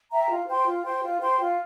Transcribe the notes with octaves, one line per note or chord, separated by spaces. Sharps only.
E5 G5 A#5
F4
C5 G5 C6
F4
C5 G5 C6
F4
C5 G5 C6
F4